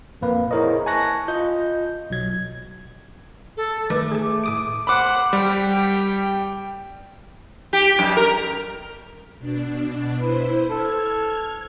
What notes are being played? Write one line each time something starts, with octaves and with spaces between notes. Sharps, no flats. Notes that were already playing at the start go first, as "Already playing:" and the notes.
F2 A#2 A#3 B4 F5
E4 G#4 A#4 C5 C#5 D#5
G#5 A5 C#6 F#6 A#6
F4 D#5 G6
B1 B2 F#3 G#6
A4
D#3 A3 B4 D6
G#4 A4
A2 D6 D#6 D7
C5 F#5 B5 D6
G3 G4 G5
G4
F#2
A#4
B2 D4
E4 B4 C5
A4 F6 G#6